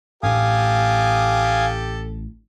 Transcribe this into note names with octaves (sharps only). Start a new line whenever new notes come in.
A1 A2 D4 G4 A4 F5 G#5 D#6